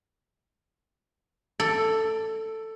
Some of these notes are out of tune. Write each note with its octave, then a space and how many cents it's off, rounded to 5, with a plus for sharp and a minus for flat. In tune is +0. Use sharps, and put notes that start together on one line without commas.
A4 +10 D5 +0